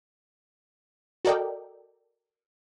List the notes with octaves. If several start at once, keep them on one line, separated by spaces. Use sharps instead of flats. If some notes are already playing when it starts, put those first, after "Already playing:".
F#4 A4 A#4 D5 D#5 G5